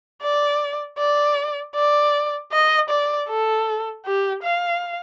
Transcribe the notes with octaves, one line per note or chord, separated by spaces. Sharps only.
D5
D5
D5
D#5
D5
A4
G4
F5